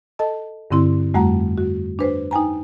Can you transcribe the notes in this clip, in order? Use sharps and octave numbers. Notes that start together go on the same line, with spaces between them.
A4 D#5 A5
G2 D3 C4 E4 C6
F2 G3 A3 F#4 F#5 A#5
F#4
D4 B4 C5
D#4 G5 G#5 A#5